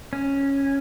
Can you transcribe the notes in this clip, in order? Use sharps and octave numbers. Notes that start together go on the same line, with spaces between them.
C#4